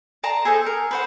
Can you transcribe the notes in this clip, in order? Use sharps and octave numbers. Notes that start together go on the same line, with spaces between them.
D5 A5 A#5 C6
G#4 A4 C5 D#5
A#4
B4 C5 F#5